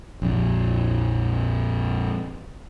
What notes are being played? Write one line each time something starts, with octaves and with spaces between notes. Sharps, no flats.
A#1 F2